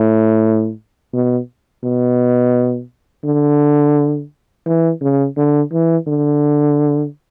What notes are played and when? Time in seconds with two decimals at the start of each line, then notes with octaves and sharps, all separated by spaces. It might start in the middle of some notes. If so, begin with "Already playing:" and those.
Already playing: A2
1.14 B2
1.84 B2
3.25 D3
4.66 E3
5.01 C#3
5.37 D3
5.72 E3
6.07 D3